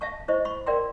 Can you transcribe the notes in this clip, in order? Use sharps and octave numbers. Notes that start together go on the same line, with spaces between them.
E5 F5 A5 C#6
E4 C5 D#5 C#6
B5 C#6
A#4 D5 F5 G5 A#5 C6